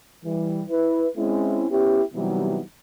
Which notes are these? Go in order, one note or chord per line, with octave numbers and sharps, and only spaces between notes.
E3 G3
E4 B4
G#3 C4 C#4 E4
B3 C#4 E4 G4
C3 E3 F#3 G3 B3 D#4